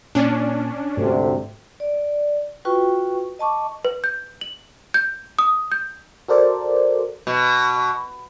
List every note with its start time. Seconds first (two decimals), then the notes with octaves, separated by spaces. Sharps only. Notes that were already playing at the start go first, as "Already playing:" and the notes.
0.15 A#2 C#4 D4
0.97 D2 G#2 C3 A3
1.80 D5
2.65 F4 F#4 B4 G5 C#6
3.39 D#5 A5 C#6 D6
3.85 B4
4.04 G6
4.41 F#7
4.94 G6
5.39 D#6
5.72 G6
6.28 F#4 A4 A#4 C5 D5
7.27 B2